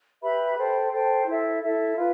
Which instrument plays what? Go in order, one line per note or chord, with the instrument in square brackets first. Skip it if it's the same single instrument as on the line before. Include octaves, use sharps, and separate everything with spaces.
[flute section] G4 B4 E5 B5
A4 C5 G5
A4 C5 G5
E4 A4 E5
E4 A4 E5
F4 B4